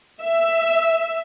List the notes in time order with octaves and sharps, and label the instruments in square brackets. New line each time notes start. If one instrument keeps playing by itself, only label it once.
[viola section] E5